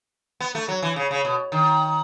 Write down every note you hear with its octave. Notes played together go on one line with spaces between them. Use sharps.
B3
A3
F#3
E3
C#3
C#3
B2
D#3